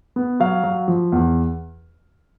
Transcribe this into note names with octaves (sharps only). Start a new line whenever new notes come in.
B3
F#3 F5
F#3
F3
E2